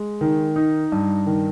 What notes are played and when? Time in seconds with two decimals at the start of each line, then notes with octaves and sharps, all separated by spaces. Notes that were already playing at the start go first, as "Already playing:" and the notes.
Already playing: G#3
0.21 D#3
0.56 D#4
0.92 G2
1.27 D#3